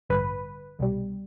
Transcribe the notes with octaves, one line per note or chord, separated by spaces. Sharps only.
A1 G2 D3 B4
C2 B2 G3